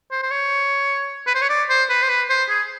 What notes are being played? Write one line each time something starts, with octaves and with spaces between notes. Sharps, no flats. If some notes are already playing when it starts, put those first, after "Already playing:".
C5
C5
C#5
B4
C5
C#5
D5
C5
B4
C5
B4
C5
G#4